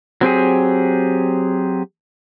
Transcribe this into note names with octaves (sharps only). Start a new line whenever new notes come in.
F#3 C4 G4 G#4